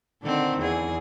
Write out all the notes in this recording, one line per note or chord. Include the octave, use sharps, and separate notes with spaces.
D3 D#3 C4
E2 G#4